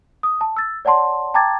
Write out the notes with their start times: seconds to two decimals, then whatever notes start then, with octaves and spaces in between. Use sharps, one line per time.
0.23 D#6
0.41 A5
0.57 E6 A6
0.85 C#5 D5 F#5 A5 C6
1.34 G5 A5 A#5 D6 G#6 A6